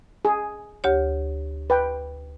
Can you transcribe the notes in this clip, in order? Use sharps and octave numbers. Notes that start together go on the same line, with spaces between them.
G#4
D2 G4 C#5
B4 G5